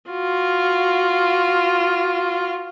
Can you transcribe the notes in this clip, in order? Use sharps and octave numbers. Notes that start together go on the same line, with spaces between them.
F4 F#4